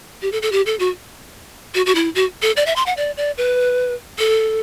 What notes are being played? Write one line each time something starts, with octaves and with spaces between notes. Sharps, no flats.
G4
A4
A4
G4
A4
F#4
F#4
F#4
E4
F#4
A4
D5
E5
C6
F#5
D5
D5
B4
A4